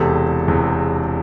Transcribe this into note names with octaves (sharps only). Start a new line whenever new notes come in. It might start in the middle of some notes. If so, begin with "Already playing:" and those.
Already playing: E1 E2 C3 G4 A4
E1 E2 C3